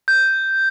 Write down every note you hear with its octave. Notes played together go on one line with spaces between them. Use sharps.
G6